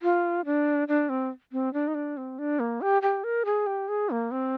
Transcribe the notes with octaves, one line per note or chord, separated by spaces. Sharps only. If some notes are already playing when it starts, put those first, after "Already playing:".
F4
D4
D4
C4
C4
D4
D#4
D4
C4
D4
A#3
G4
G4
A#4
G#4
G4
G#4
A#3
C4